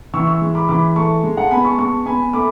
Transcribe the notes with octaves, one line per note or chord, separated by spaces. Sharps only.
E3 C#6 E6
C#6 E6
G#3
B5 D6
E3 B5 D6
A3 A5 C#6
G#3
F#5 A5
B3 G#5 B5
A5 C#6
G#3 A5 C#6
B3 G#5 B5
A3 B5 D6